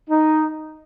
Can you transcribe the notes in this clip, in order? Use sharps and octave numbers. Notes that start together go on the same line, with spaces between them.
D#4